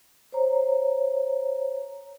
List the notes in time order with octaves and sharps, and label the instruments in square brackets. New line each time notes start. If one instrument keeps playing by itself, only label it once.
[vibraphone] C5 C#5 A#5